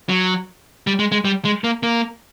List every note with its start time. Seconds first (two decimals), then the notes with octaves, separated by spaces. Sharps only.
0.09 F#3
0.87 G3
0.99 G#3
1.12 G#3
1.25 G3
1.45 G#3
1.64 A#3
1.83 A#3